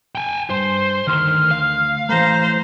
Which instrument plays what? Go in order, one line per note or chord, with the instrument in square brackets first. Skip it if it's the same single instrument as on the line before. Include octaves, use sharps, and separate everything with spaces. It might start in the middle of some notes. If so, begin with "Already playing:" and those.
[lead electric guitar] G5 G#5
[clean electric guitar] G2 [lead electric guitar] C5 [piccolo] C6
[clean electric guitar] D2 C6 [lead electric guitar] D#3 [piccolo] F6
[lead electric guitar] F5
[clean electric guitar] E3 A3 [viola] C5 [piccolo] A#5